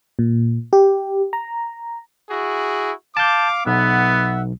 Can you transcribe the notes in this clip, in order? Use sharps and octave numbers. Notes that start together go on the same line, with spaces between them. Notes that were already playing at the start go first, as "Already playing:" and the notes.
A#2
G4
A#5
E4 F#4 G#4
F5 A5 D6 G6
B1 B3 E5 F#5